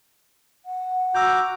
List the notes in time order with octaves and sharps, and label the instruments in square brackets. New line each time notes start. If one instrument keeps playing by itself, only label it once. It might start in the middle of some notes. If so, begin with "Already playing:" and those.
[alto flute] F#5
[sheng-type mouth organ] F#4 A#5 D6 [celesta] E6 G6